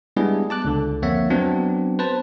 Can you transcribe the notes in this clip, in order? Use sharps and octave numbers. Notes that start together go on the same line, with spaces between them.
G3 G#3 B3 D4 E4 G#4
A5 D6 F#6
C#2 D3
F2 A#3 C#5 E5 F#5
F#3 B3 C4 D4
B4 C5 A5